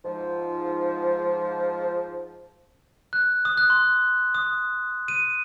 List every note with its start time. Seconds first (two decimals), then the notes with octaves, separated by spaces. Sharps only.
0.04 G#2 F3
3.13 F#6
3.45 D#6
3.57 F#6
3.70 C6
4.35 D#6
5.08 D#7